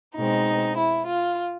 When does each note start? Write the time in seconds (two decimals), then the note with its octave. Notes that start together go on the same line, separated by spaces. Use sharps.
0.16 B2 G#3 C4 D#4
0.77 E4
1.07 F4